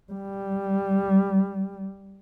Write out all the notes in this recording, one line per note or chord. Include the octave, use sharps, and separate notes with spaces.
G3